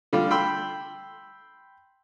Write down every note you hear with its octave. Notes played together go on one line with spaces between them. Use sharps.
D3 G3 F4
G5 B5 C6 E6